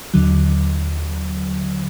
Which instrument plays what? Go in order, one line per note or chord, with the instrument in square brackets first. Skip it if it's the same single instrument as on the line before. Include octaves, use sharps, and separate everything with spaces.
[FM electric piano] D#2 D3 F#3